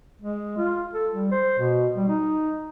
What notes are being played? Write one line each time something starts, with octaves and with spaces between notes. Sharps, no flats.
G#3
F4
A4
G3
C5
B2
G3
D#4